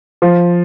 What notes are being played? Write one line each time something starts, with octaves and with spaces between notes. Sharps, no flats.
F3